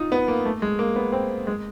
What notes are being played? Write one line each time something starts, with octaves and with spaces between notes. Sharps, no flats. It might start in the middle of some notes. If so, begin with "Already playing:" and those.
Already playing: D#4 F4
B3
A#3
A3
G#3
A#3
B3
C4
G#3